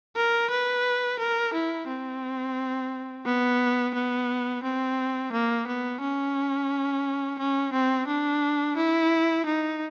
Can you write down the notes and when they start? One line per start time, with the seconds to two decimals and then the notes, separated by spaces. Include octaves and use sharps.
0.16 A#4
0.50 B4
1.19 A#4
1.54 E4
1.88 C4
3.26 B3
3.95 B3
4.64 C4
5.33 A#3
5.67 B3
6.01 C#4
7.39 C#4
7.73 C4
8.08 D4
8.77 E4
9.46 D#4